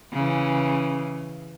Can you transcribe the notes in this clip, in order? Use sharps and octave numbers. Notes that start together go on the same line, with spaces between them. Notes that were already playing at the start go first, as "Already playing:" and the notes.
C#3 E3